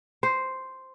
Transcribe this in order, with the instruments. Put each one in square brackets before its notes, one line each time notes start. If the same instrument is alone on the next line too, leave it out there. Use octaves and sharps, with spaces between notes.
[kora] C5